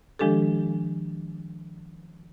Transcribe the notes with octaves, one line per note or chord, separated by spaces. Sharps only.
D#3 F3 G#3 D4 G4 A4